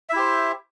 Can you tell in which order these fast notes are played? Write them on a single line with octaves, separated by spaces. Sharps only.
E5 E4 G4 C5